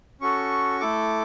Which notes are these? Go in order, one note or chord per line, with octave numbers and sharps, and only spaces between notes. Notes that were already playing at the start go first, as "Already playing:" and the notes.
C#4 F#4 A4 C#6
A3 E4 A4 D6